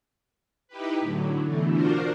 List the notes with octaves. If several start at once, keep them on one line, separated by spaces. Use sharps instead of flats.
D#4 E4 G4 B4
A2 D3 F#3
B2 D3 E3 A3
D4 F4 F#4 A#4 C5